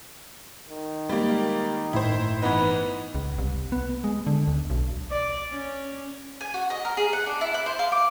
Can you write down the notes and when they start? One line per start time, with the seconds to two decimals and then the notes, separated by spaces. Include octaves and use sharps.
0.69 D#3
1.09 G3 G#3 A#3
1.93 G1 A2 A3 E4 C5
2.42 E3 B3 D#4 B4
3.15 C#2
3.38 C2
3.72 B3
4.04 G#3
4.27 D3
4.48 D2
4.70 B1
5.10 D5
5.50 C#4
6.41 G#5
6.54 F#4
6.70 D#5
6.85 A#4
6.97 G#4
7.13 F#5
7.26 D4
7.41 E4
7.54 F#6
7.66 C5
7.79 F5
7.92 D6